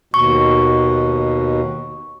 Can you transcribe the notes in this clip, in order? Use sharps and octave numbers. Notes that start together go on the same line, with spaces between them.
D#2 B2 C#6